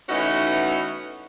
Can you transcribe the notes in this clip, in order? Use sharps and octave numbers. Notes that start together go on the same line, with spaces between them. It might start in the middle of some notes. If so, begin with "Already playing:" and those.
E3 A3 B3 C#4 D#4 F#4